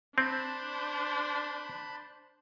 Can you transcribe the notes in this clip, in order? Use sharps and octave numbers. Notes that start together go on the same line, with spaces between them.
C4 D4 C5 A5 B5 F#6